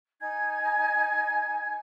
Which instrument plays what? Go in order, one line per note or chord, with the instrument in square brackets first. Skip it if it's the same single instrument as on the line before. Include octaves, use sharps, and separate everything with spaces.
[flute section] D#4 G#5 G#6